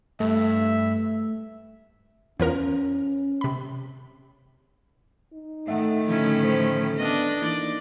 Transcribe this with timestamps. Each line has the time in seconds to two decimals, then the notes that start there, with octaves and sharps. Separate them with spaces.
0.20 G2 A3 E5
2.39 E2 F3 C#4 A#4
3.41 C3 B5
5.34 D#4
5.68 A2 D#3 A3 E5 F#5
6.08 D3 F3 C#4 E4
6.44 C5
6.97 B3 D4 D#5
7.42 E3 A#3 D#4 E4 D5